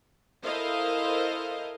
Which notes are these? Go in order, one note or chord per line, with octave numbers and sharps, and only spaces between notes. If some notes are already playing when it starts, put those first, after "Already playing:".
E4 A4 A#4 C5 D#5 F5